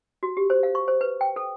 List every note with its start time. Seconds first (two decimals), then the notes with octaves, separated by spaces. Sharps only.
0.23 F#4
0.37 G4
0.50 C5
0.63 F5
0.75 C#6
0.88 C5
1.01 B4
1.21 G5
1.36 A4